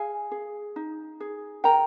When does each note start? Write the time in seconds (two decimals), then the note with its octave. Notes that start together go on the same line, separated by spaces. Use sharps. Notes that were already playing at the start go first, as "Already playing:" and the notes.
Already playing: G#4 F5 G#5
0.31 G#4
0.76 D#4
1.20 G#4
1.64 A#4 G5 A#5